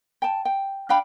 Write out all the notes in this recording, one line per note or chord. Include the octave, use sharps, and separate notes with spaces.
G5 A5
G5
D4 F5 G5 B5